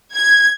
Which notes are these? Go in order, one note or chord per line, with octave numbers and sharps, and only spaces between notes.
G#6